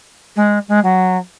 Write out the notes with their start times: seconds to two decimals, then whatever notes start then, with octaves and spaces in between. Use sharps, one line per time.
0.36 G#3
0.68 G#3
0.84 F#3